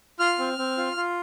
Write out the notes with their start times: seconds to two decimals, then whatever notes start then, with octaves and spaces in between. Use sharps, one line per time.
0.19 F4 F6
0.39 C4
0.58 C4
0.77 F4
0.96 F4